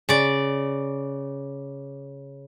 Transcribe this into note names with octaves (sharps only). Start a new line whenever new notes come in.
C#3 D5